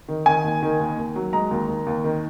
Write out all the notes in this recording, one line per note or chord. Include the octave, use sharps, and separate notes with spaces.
D#3
D#3 G#5
D#2
D#3
D#2
D#2
F#3
G#3 A#5
D#2
D#2
D#2
D#3